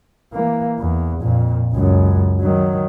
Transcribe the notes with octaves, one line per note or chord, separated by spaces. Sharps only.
E3 A#3
E2
F2 A#2
C#2 F#2
D#3 F#3